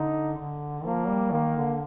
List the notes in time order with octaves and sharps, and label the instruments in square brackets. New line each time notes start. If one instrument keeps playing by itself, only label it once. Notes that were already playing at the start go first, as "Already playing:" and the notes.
Already playing: [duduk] D3 [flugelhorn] D#4
[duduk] D3
[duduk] F3 [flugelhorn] A#3
[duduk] G3
[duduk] D#3 [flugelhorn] A#3
[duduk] D3